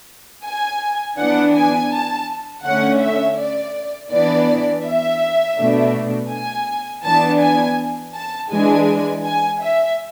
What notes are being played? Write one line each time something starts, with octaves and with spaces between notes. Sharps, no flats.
G#5
E3 B3 D4 F#5
G#5
A5
D3 A3 C#4 F#5
E5
D5
E3 B3 D4 D5
E5
B2 A3 D4
G#5
E3 B3 D4 A5
G#5
A5
E3 G#3 D4 G#5
G#5
E5